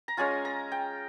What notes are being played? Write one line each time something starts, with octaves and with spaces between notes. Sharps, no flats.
A#5
G#3 C#4 F4 G#5
A#5
G5